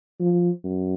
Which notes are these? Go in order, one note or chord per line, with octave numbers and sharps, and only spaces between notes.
F3
F#2